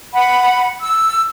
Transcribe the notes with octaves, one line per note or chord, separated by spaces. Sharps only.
F#5 B5
E6